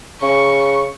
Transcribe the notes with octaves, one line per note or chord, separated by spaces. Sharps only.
C#3 C#6